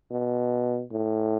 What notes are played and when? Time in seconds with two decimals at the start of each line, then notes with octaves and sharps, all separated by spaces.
0.11 B2
0.91 A2